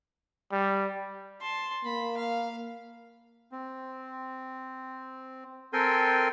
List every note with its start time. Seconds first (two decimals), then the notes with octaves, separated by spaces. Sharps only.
0.52 G3
1.41 A5 C6
1.85 A#3 B5
2.17 F5
3.52 C4
5.73 C4 A4 A#4 G5 G#5 C6